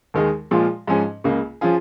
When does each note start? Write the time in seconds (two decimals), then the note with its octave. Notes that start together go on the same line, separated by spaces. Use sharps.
0.14 D#2 D#3 G#3 D#4 G#4
0.51 A#2 F3 G#3 F4
0.87 G#2 F3 C#4 G#4
1.24 C#2 C#3 A#3
1.61 F3 C#4 F4 G#4